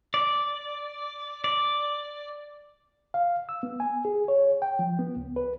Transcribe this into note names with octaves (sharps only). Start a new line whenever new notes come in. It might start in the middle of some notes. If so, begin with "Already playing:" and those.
D5
D5
F5
E6
B3
G#5
G#4
C#5
G5
F3
B3
C#2
B4